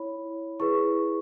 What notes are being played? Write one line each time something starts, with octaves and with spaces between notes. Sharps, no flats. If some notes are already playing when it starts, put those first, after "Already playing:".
Already playing: E4 C#5 B5
E4 G#4 B4 C#6